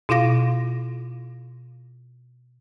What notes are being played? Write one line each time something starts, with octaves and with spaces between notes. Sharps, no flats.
B2 E4 F4 F5 A#6